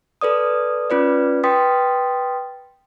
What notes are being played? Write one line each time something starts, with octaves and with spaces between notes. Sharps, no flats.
A4 B4 D5 D#6
C#4 F4 B4 D5
B4 G5 C6 D#6 A6 B6